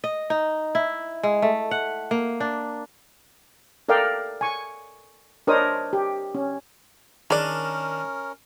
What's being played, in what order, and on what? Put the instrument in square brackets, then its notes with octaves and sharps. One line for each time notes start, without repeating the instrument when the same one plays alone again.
[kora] D#5
D#4
E4
G#3
A3
F#5
A#3
D4
[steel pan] A4 A#4 D5 F5 G5
G#5 C#6
D4 A#4 C5 C#5 D#5 D#6
G4
C#4
[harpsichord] D#3 D4 [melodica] C#4 A#4 [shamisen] G#4 D5